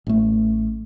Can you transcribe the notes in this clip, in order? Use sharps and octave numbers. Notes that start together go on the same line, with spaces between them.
A1 A3